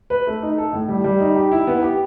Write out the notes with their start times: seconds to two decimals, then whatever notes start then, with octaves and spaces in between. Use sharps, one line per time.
0.10 B4
0.27 A3
0.42 D#4
0.58 A4
0.73 A2
0.88 G3
1.04 G3
1.20 D#4
1.36 G4
1.52 E4
1.67 B3
1.83 G4